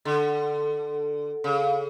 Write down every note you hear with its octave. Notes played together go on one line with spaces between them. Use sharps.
D3 A4
C#3